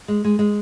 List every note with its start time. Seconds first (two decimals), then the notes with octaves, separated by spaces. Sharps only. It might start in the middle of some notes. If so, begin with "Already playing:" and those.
0.08 G#3
0.24 G#3
0.39 G#3